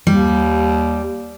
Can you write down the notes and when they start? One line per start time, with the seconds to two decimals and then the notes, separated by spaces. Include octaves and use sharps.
0.07 D#2 G3